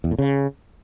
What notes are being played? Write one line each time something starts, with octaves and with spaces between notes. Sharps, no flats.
E2
A2
C#3